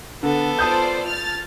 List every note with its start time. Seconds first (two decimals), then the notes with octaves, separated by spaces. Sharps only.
0.23 D3 B3 A4
0.59 F4 C5 D5 A5 D#6 G6
1.07 F6 A6